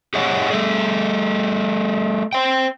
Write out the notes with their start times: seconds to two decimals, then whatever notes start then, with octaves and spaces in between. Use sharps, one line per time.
0.14 G4 G#4 C#5 D#5 F#5 G#5
0.51 G3 A3 G#4
2.33 C5 G5